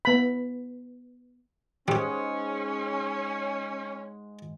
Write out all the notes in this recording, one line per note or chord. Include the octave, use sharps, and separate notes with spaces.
B3 B5
G#2 G3 G#3 C#4 G4